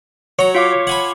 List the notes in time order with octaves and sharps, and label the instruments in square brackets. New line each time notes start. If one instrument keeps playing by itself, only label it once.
[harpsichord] F#3 A#5 [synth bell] C#5
[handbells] F4 F5 D6
[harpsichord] F#5 G#5 B5